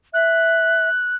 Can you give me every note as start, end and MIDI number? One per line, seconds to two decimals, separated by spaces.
0.14 0.89 76
0.14 1.16 90